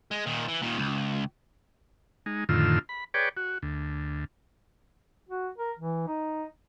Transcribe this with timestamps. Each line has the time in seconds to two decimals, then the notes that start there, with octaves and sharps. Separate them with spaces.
0.11 G#3
0.26 A#2 D#3
0.48 E3
0.62 A#2 D#3
0.77 C#2
2.26 G#3 D#4
2.49 F2 A2 D3 D#3 F4 E6
2.89 B5
3.14 G#4 B4 C#5 D5 G5
3.37 F#4
3.62 D2
5.29 F#4
5.58 A#4
5.79 E3
6.08 D#4